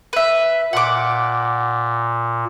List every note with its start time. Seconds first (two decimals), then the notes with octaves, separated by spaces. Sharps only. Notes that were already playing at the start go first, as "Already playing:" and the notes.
0.13 B4 E5
0.73 A#2 F#5 D6